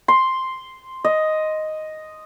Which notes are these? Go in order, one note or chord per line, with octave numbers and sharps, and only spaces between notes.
C6
D#5